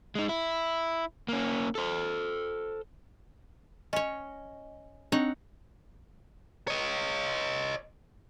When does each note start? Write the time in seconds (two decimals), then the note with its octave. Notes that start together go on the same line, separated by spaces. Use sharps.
0.15 G#3 D#4
0.29 E4
1.28 A#3 C#4
1.75 A4 C5
3.93 C#4 C#5 D#5
5.12 C4 D4 D#4 C#5 F#5
6.68 C#5 D#5